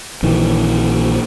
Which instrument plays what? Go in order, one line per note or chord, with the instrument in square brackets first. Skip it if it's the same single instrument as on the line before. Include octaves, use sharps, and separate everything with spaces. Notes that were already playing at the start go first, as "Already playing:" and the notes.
[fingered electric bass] A#1 D#3 E3